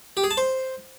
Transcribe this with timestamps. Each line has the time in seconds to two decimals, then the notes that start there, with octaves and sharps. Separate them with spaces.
0.17 G4
0.24 G#4
0.31 A5
0.37 C5